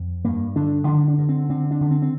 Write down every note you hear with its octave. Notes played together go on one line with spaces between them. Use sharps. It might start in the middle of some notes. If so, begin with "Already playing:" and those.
Already playing: F2
G2 A#3
D3 D4
D3 D4
D4
G2
C4
D3 C4
D4
D3
C4
C4